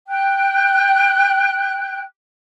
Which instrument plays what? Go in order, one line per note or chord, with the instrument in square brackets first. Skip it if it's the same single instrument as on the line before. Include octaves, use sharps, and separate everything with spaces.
[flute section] G5 F#6